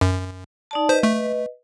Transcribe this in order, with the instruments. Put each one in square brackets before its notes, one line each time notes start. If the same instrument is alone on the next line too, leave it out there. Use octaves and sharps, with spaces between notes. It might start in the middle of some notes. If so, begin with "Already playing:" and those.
[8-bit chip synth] F#2
[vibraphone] D#4 D5 A5
[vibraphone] B4 D#5 [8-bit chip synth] C5
[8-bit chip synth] A3